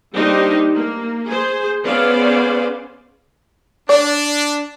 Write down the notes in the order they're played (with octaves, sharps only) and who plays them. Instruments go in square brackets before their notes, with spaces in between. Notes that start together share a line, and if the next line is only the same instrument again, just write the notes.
[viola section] G3 A#3 D4 D#4 G4 C5
A#3
G#4 C5
B3 C#4 G#4 C5 D5 F5
[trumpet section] D4 [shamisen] D5